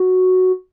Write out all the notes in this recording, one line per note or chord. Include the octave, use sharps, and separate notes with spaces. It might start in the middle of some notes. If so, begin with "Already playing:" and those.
Already playing: F#4